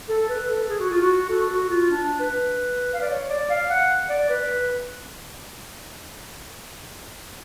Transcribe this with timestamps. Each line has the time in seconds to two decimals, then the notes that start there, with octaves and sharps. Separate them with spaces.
0.09 A4
0.29 B4
0.49 A4
0.69 G#4
0.80 F#4
0.90 F4
1.01 F#4
1.29 A4
1.49 F#4
1.69 F4
1.90 D4
2.20 B4
2.94 F5
3.01 D5
3.10 C#5
3.30 D5
3.50 F5
3.70 F#5
4.09 D5
4.29 B4